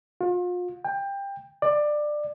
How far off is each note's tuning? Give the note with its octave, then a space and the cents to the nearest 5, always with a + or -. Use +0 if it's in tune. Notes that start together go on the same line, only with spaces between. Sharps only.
F4 +35
G5 +20
D5 +20